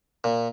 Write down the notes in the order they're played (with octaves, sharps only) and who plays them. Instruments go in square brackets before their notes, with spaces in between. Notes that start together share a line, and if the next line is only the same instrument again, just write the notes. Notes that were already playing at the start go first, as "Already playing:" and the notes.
[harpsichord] A#2